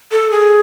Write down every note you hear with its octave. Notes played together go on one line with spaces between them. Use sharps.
A4
G#4